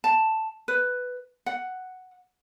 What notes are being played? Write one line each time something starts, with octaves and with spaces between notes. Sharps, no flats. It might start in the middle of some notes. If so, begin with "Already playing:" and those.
A5
B4
F#5